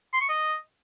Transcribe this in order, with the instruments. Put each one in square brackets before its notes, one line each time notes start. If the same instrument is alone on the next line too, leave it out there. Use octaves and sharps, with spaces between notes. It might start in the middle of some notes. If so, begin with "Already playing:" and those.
[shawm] C6
C#6
D#5